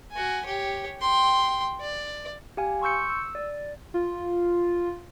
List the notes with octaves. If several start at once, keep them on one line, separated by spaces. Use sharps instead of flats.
F#4 G#5
G4 C#5
G5 C6
D5
G4 F5 G#5
C6 C#6 E6 G6 C#7
E6
D5
F4